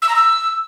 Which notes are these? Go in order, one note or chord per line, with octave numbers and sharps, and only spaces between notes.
E6
A#5
E6